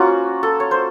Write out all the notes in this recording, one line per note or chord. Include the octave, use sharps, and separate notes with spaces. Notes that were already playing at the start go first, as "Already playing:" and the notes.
Already playing: A#3 C#4 F4 F#4
A4
C#5
C5